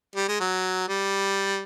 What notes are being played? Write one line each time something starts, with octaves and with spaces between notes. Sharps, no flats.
G3
G#3
F#3
G3